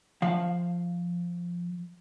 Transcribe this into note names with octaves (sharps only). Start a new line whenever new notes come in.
F3 F5